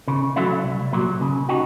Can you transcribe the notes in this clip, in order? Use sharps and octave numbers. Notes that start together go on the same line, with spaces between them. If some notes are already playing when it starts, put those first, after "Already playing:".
C#3
F#3 A3 C#4 E4
C2
A#2 F#3
C#3
D#4 F#4